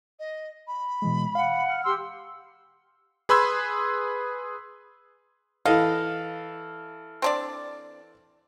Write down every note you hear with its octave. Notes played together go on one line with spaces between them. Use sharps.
D#5
B5
B2 E3 G#3
F5 F#5
F6
G4 C6 E6
G#4 B4 B5 C6 E6 G#6
E3 A4 D#5 F5
C4 D4 D5